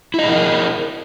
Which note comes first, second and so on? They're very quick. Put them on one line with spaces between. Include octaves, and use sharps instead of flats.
E4 D#5 G#4 A#4